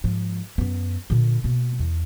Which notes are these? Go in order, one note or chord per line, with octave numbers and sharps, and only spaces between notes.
G#2 F3
F#2 B3
A#2 D3
B2 A#3
E2